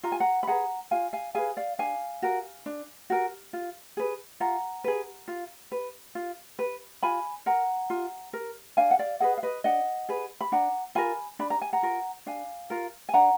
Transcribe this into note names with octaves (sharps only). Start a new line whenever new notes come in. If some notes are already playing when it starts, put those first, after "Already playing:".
F4 A#5
G#5
F#5 A#5
B5
G#4 B4 F#5 A#5
F4 F5 G#5
F5 G#5
G#4 B4 F5 G#5
D5 F5
D4 F5 G#5
F#4 A#4
D4
F#4 A#4
F4
G#4 B4
F4 F#5 A#5
G#4 B4
F4
B4
F4
B4
F4 G#5 B5
A#4 F#5 A#5
F4
A#4
D4 F5 G#5
F#5
D5 F5
G#4 B4 D#5 F#5
F5
B4 D#5
D4 D#5 F#5
G#4 B4
B5
D4 F#5 A#5
F4 A#4 G#5 B5
D4 B5
A#5
G#5
F#5 A#5
F4 A#4
D4 F5 G#5
F4 A#4
G#5
D4 F#5 A#5